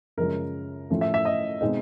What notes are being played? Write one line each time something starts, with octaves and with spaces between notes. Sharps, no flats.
F#2 C#3 F3 G#3 A#4
A2 F3 A3 C#4
E5
E5
D#5
B2 G#3 C4 D#4